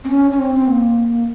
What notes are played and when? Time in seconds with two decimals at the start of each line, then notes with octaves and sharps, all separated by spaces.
0.04 C4
0.09 C#4
0.31 C#4
0.39 C4
0.55 C4
0.67 A#3